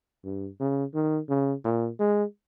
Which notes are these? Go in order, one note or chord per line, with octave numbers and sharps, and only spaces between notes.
G2
C#3
D#3
C#3
A#2
G#3